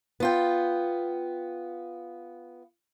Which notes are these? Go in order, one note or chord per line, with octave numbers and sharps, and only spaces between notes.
B3 F4 G5